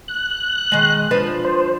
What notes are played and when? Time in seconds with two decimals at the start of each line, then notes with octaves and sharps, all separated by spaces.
0.08 F#6
0.72 D#3 G#3
1.11 F3 D4 B4
1.45 C5